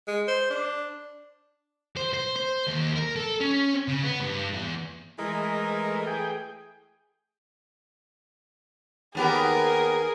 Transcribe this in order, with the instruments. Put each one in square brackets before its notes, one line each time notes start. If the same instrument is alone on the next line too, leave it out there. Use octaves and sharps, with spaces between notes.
[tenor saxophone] G#3
C5
D4
[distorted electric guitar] C5
C5
C5
D#2
A#4
A4
C#4
C#3
B3
G2
E2
[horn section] E3 A3 [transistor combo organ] G#3 A#4 D#5
[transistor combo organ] G#4 G5
[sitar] D#2 B3 G4 [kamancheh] G#4 A#4